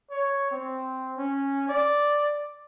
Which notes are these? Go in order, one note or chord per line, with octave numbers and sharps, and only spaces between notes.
C#5
C4
C#4
D5